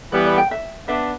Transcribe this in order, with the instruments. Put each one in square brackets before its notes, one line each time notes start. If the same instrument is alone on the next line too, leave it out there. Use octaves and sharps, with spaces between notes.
[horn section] E3 G3 B3 [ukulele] D5
[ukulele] D5
G5
E5
[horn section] B3 D4 [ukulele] E5